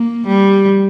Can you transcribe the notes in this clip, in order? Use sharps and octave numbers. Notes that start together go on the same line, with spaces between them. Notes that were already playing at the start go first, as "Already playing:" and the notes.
Already playing: A#3
G3